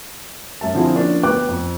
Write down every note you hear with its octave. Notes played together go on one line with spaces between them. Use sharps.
F#2 E5 A5
D3 F3 C4 E4 F4 G#4
F3 A#3 C#4 D4
D2 B3 G5 D6 F#6
F2